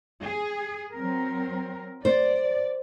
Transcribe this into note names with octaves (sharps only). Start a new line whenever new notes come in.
G#4
F#3 C4 A#4
C5 D5